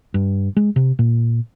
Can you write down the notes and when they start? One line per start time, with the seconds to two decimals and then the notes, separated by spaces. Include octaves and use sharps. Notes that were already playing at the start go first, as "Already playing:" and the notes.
0.14 G2
0.56 G#3
0.76 C3
0.99 A#2